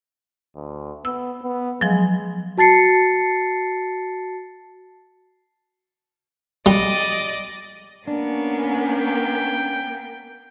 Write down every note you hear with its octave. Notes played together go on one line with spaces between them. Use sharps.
D2
B3 E6
B3
F3 F#3 G#3
F#4 A5 A6 C7 C#7
G3 D5 D#5
A#3 B3 C#4 D4
G5